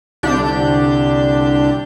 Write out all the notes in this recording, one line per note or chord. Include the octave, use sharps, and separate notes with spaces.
C2 D3 D4 G4 G6